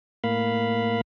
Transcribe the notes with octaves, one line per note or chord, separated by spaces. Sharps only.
A2 A#3 F5 B5